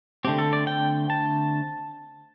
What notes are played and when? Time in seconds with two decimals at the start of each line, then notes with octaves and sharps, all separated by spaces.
0.25 D3 A3 C4 G4
0.38 A4
0.53 D5
0.67 G5
1.10 A5